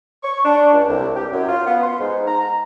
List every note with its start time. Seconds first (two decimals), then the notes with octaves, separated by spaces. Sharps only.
0.24 C#6
0.45 D4
0.72 C#2
0.89 C2
1.16 G4
1.32 F#2
1.49 F4
1.67 B3
1.83 C6
2.00 G#2
2.28 A#5